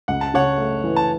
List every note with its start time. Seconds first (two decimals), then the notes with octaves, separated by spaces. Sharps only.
0.08 C#2 F#5
0.21 A5
0.34 C#3 C#5 F#5
0.58 A3
0.84 E3
0.96 A5